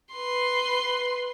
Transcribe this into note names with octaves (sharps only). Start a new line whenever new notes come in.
B4 C6